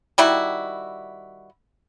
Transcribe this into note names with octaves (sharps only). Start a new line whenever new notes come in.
D#3 G3 E4 F#4